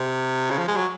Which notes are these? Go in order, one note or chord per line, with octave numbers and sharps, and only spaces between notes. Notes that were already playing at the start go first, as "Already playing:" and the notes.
Already playing: C3
C#3
F3
G#3
F#3